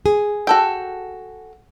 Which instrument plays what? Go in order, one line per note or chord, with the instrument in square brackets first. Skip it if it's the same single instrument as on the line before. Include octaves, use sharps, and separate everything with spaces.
[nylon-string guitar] G#4
[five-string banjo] F#4 A4 G5